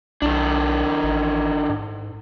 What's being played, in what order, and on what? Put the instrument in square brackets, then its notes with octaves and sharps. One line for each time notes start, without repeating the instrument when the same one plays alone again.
[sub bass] B1 [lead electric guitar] D#3 D4
[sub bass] A1
G#2